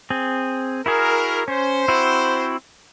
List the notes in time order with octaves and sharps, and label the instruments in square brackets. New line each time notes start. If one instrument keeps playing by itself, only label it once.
[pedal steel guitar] C4 G#4
[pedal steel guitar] E4 F#4 G#4 [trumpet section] A#4
[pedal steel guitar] C#4 [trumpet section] C5
[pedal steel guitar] C4 E4 F#4